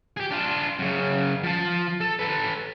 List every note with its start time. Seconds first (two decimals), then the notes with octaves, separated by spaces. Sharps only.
0.17 G4 G#4
0.31 D4 F4
0.79 F#2 C#3
1.43 F3 A5
2.01 A4
2.19 A4 B4